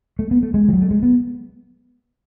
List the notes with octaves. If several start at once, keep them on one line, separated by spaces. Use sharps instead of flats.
A3
B3
A3
G#3
E3
F#3
A3
G#3
B3